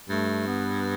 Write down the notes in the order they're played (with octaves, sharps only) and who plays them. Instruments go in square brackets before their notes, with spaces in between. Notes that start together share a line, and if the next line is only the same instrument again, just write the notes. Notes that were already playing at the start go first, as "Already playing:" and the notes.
[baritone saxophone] G2 [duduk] A3
[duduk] B3